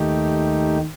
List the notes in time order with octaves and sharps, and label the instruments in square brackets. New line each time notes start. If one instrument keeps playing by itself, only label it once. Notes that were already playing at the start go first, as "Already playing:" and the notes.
Already playing: [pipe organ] D#2 D#3 A3 D#4 G4